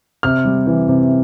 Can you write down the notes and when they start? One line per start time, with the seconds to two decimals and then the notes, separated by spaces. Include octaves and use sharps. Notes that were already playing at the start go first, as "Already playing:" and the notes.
0.23 C3 F6
0.45 G3
0.67 E3
0.88 C3